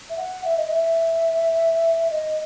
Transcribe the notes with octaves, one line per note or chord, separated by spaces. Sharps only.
E5
F#5
E5
D#5
E5
D#5